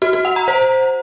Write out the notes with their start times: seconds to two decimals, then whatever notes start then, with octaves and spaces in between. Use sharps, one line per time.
0.02 F#4
0.13 F#4
0.25 F#5
0.36 A#5
0.48 C5